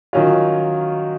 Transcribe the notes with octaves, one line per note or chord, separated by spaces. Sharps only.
D#3 F#3 C#4 F4